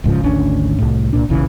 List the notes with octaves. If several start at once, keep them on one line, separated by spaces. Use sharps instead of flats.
D1 G#2 C#3 F3
G#1 D2 C#4 D4
C2 A2
C2 A#2 D4
E1 A#1 C#3 E3